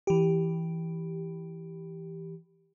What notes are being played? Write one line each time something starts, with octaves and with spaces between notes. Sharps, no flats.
E3 G4